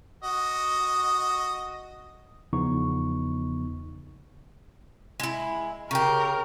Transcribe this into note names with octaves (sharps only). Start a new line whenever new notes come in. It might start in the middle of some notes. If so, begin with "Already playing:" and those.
F#4 D#5
E2 C#3 F3 B3 D#4 C#6
G#3 E4
C#3 G4 A#4